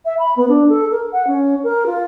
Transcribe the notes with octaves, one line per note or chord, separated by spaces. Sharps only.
E5
B5
B3
D4
A4
A#4
F#5
C#4
A#4
F4